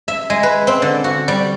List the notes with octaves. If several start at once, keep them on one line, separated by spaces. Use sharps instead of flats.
E5
G#3
B4
C4
D3
F#4
G3